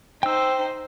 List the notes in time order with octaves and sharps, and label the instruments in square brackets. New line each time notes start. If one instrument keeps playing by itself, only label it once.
[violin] D#4 C5 [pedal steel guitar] G5 E6